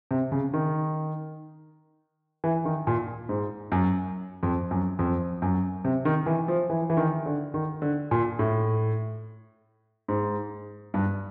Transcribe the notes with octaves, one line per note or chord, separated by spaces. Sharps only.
C3
C#3
D#3
E3
D#3
A#2
G#2
F#2
F2
F#2
F2
F#2
C3
D#3
E3
F3
E3
E3
D#3
D3
D#3
D3
A#2
A2
G#2
G2